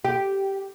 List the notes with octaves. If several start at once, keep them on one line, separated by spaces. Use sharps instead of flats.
G4